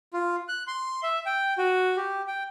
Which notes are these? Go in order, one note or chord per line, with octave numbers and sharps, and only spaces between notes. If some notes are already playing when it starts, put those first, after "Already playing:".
F4
F#6
C6
E5
G5
F#4
G4
G5